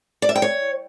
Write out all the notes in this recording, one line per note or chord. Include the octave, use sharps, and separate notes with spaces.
D5
E5
G5
C#5